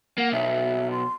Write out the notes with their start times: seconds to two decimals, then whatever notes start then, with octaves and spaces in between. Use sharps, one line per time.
0.18 A#3 F#5
0.32 B1 E5
0.92 C6